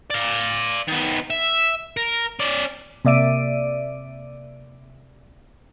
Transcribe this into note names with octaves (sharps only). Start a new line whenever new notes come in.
D5 F5
D#3 B3
E5
A#4
C#4 D5
C3 A#3 D5 E5 D7 D#7